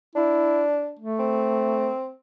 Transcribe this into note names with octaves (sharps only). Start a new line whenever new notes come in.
D4 E4
A3
C4